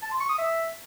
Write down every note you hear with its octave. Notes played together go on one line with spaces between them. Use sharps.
A5
C6
C#6
D#6
E5